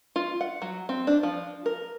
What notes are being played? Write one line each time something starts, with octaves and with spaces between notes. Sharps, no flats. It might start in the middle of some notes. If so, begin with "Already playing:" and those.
F4
F#5
F#3
C4
D4
F3
A#4